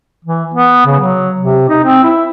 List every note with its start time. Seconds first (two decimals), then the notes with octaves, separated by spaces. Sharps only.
0.25 E3
0.54 B3
0.86 C#3
1.00 F#3
1.40 C3
1.69 D#4
1.84 C4
2.03 E4